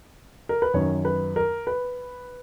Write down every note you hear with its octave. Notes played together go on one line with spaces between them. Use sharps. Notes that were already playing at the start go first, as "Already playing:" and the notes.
A#4
B4
F#2 D#3 C#5
B4
A#4
B4